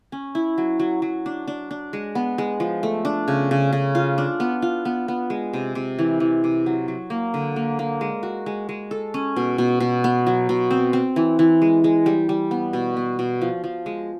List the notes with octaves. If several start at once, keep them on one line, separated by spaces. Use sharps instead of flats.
C#4
E4
F#3
F#3
F#3
D4
D4
D4
G#3
B3
G#3
F3
A3
D4
C#3
C#3
C#3
F4
D4
B3
F4
B3
B3
G#3
C3
C3
E3
E3
C3
F#3
F#3
A#3
D3
A#3
A#3
G#3
F#4
G#3
G#3
A4
C#4
B2
B2
B2
B3
F#3
B2
C4
C4
E3
E3
G#3
G#3
G3
G3
B3
B2
B3
B2
F3
F3
G#3